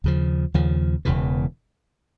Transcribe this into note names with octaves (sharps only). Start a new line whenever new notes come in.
D#2 C#3 F3
D#2 C#3 F3
E1 E2 C#3 E3